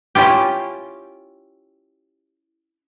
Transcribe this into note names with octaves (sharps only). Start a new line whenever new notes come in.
C#4 E4 F4 G4